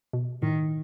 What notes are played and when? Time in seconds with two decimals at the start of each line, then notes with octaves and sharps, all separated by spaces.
0.13 B2
0.42 A2 D#3